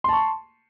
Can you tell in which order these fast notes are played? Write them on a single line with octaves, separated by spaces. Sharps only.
C6 A5 C#6